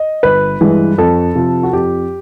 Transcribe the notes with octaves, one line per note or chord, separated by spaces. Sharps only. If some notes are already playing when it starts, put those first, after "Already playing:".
Already playing: D#5
G1 B4
G2 E3 G#3
F2 A4
C3 F3
F#4
F2 G4